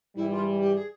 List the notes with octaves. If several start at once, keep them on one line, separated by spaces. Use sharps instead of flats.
G#2 E3 G3 E4
F4
G4
G#4